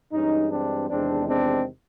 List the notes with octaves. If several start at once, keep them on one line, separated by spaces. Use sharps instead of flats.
G2 E3 G#3 C#4 D#4
C4 D4
E2 C3 D#3 G#3 C4 D4
C4 D4